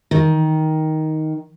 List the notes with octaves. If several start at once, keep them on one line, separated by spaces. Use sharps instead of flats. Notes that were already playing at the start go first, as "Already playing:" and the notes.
D#3